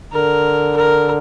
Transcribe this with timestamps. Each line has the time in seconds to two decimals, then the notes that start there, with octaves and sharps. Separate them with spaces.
0.12 D3 A#4
0.76 A#4